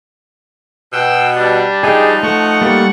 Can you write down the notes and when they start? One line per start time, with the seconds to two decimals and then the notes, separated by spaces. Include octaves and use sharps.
0.93 B2 G5 E6
1.35 G3 D4
1.83 F3 D#4 G#4 D#5 G5
2.23 A3 F#5 C#6
2.61 G3 A3 A#3